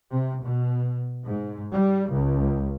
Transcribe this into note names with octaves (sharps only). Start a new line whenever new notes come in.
C3
B2
G#2
G3
C#2